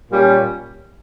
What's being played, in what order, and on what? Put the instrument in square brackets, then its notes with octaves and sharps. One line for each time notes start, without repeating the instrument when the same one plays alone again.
[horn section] A#2 G3 C#4